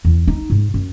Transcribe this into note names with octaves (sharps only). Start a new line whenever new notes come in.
E2
D#4
G#2
F#2